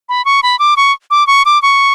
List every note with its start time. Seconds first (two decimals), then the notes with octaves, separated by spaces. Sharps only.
0.09 B5
0.25 C#6
0.43 B5
0.59 D6
0.77 C#6
1.11 D6
1.27 C#6
1.45 D6
1.62 C#6